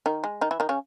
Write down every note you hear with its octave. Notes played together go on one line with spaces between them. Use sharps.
D#3 D#4
G#3
D#3 D#4
E3 E4
D#3 D#4
C#3 C#4